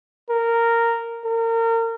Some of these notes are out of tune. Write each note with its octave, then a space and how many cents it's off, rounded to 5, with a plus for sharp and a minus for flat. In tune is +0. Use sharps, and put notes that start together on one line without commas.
A#4 -10
A#4 -30